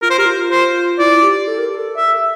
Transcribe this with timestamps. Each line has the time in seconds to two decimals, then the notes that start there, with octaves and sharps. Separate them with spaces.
0.02 F4 A#4
0.10 C5
0.18 G4 A#4
0.26 F4
0.51 C5
0.99 E4 D5
1.23 G4
1.48 A4
1.58 A#4
1.69 A4
1.97 E5
2.13 E5